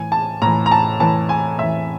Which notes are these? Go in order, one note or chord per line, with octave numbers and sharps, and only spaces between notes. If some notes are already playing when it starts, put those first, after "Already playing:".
Already playing: A2 E3 G#5
A5
A2 E3 A#5
A#5
A5
A2 E3 A5
G#5
A2 E3 E5